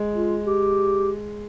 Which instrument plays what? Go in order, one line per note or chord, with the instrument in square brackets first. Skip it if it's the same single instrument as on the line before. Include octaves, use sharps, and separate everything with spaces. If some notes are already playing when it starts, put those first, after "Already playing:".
Already playing: [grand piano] G#3
[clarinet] F4
G4